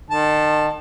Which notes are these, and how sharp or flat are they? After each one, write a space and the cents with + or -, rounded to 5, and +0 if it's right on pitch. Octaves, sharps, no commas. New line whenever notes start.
D#3 -35 A5 +0